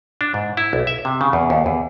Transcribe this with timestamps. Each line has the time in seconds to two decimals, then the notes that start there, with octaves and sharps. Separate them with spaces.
0.21 D4
0.34 G#2
0.57 E4
0.73 B1
0.87 E5
1.05 C3
1.21 C#3
1.33 E2
1.50 D#2
1.66 E2